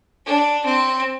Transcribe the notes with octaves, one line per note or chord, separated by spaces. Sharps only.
D4
C4